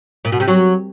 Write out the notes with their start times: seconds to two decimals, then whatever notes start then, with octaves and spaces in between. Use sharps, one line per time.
0.25 A#2
0.32 B2
0.40 C3
0.48 F#3